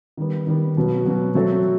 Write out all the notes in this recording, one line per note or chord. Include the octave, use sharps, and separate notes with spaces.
D#3 G3 B3
D#3 G3 B3
B2 F#3 B3 F#4
B2 F#3 B3 F#4
F#3 A3 C4 F#4 A4